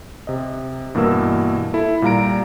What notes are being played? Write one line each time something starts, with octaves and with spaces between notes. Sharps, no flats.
C3 D#5
G2 B2 E3 A#3 A#4 E6
E4 A4
A#2 G3 F5 A#5 D7